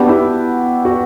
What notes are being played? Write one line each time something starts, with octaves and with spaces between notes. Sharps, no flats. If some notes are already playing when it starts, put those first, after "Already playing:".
Already playing: B3 D4 F#4 G4
E4
F#4